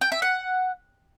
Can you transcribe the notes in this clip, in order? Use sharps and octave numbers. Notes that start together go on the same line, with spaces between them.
G5
E5
F#5